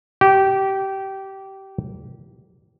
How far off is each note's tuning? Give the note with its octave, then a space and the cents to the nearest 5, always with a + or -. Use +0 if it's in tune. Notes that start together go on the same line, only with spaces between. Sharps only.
G4 -20